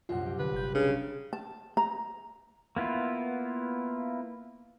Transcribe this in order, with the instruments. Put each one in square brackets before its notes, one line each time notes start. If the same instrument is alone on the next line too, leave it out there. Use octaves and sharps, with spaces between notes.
[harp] C2 F#2 A#2 [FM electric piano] F4 F#5
[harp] G4
[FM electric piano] D3 [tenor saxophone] B4
[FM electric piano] G1 G6
[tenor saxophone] C#3 [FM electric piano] D4 G#4
[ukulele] A5
A#5
[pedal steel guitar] A#3 B3 E4 F4